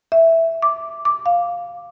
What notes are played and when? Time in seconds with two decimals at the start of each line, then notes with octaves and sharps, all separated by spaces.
0.12 E5
0.62 D6
1.05 D6
1.26 F5